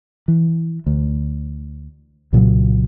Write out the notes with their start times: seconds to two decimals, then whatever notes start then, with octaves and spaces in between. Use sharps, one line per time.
0.28 E3
0.86 D2
2.33 C2 A#2 C#3 F#3